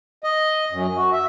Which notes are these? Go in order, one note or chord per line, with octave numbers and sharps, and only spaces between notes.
D#5
F#2
F#4
E5